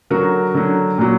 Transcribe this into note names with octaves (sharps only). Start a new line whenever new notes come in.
D3 F#3 F#4 A#4
D3 F#3
A#2 F#3